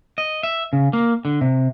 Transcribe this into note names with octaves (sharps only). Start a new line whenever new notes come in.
D#5
E5
C#3
A#3
D3
C3